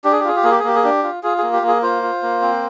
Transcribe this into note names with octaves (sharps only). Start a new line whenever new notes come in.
D4 G4
G#4
G4
F4 G#4
G4
A#3 G#4
G4
G#4
A#3 G4
G#4
D4 G4
F4
F4 G#4
A#3 G#4
G4
A#3
G#4
F4 C5
F4
A#3
C4